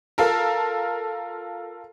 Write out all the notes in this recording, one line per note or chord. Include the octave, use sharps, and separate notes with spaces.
F4 A4 A#4